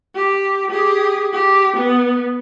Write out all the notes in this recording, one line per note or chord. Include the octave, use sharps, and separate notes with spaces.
G4
G4 G#4
G4
B3